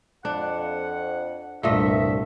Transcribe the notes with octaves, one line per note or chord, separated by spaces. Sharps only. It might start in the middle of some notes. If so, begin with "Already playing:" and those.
F2 D4 F#5
C2 G2 A#2 A3 D#5 E5